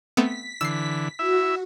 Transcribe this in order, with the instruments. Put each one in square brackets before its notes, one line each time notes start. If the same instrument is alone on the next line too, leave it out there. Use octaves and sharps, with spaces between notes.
[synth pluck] A3 B3 C4 [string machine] B6
[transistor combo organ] D3 E3 [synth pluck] E6 C7
[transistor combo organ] E4 E5 [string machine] F#4